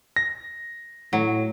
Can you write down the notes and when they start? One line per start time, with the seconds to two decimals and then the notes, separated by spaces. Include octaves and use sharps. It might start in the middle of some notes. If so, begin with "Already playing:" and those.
0.16 A#6
1.13 A2 F#3